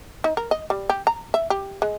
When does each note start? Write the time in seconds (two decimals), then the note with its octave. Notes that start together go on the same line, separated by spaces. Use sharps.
0.24 D#4
0.37 A#4
0.51 D#5
0.70 G3
0.90 G4
1.07 A#5
1.34 E5
1.50 G4
1.82 G#3